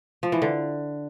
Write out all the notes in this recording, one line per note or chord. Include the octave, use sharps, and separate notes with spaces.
F3
E3
D3